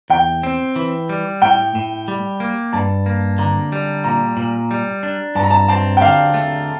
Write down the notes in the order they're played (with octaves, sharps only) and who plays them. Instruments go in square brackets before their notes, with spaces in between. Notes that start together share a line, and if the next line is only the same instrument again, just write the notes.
[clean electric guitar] E2 [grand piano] G5
[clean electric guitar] C4
E3
G3
[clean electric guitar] A2 [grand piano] G5
[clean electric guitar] A2
G3
A#3
[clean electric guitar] G2 [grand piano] A5
[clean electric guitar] A#3
[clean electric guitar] D3 [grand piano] A#5
[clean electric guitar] G3
[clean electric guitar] A#2 [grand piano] A#5
[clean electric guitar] A#2
G3
D4
[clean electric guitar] G2 [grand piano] A5
[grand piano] A#5
A5
[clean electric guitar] C4 [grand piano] A5
[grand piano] G5
[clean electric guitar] D3 [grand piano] F5
[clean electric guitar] A3